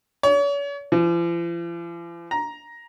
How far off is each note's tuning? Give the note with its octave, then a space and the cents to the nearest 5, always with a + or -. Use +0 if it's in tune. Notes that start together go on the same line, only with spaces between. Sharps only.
C#5 +40
F3 -45
A#5 +10